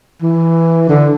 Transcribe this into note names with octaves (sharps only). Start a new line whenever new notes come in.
E3
D3